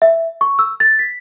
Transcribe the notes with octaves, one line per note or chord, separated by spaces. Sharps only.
E5
C#6
E6
A6
B6